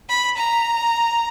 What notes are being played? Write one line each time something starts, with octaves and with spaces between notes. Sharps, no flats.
B5
A#5